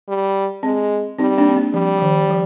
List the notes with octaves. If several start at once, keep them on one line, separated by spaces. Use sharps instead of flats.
G3
G#3 C4
G3 C4 D#4
A#3 D4
C4
A#3
F3 G3
F3
D#3
F3